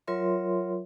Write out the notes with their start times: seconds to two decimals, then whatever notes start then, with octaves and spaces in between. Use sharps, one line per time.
0.07 F#3 F4 A#4 C#5 E5 C6